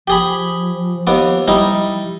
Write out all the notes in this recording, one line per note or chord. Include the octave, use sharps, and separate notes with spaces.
F3 G4 G#4 B5
D#2 B3 D6
G3 D#4 E4